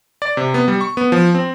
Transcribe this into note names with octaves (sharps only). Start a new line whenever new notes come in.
D5
C3
B3
G3
C#6
B3
F3
C4